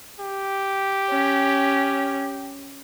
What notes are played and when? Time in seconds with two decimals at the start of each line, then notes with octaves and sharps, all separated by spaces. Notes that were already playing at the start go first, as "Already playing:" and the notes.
0.20 G4
1.11 C#4